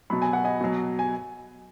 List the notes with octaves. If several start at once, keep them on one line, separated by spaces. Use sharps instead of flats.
B2 F#3 B5
G#5
F#5
D#5 G#5
B2 F#3
G#5